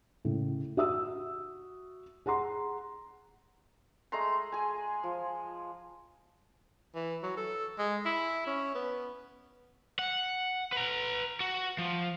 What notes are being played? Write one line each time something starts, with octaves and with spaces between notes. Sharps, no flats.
A2 C#3
F#4 E5 D#6 E6
G#4 F#5 A#5 C6
G#3 A3 A#5 C6
G#4 G#5
F3
E3
F#3
A4
G#3
E4
C#4
B3
F#5
B4 A#5
F#4
F3